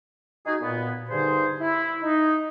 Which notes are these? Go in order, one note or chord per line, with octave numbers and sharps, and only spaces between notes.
D#4 F#4 G#4
A#2 B3
G2 D3 D#4 G#4 C5
E4
D#4